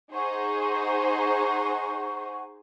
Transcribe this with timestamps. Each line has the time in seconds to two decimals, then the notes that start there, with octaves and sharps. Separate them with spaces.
0.12 D#4 G#4 C5 F#5 C#6